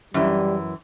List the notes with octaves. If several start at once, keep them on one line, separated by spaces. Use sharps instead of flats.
F#2 E3 G3